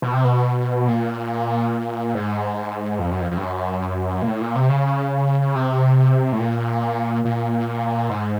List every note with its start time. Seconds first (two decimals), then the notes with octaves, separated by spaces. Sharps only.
0.02 B2
0.13 C3
0.24 B2
0.88 A#2
2.15 G#2
2.99 F2
3.11 F#2
3.21 F2
3.31 F2
3.37 G2
3.43 F#2
4.22 A#2
4.27 A2
4.41 A#2
4.55 C3
4.69 C#3
5.55 C3
6.32 A2
6.40 A#2
7.25 A#2
8.10 G#2